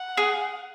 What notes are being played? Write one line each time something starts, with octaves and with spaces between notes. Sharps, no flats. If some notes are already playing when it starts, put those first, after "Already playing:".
Already playing: F#5
G#4